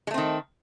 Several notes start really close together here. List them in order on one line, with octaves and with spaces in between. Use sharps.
G#3 A3 C4 D#3